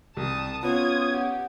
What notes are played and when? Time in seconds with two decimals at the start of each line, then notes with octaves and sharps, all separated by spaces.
0.17 C2 A5 D#6
0.63 B3 C#4 F4 D#6 G#6
1.13 G4 F#5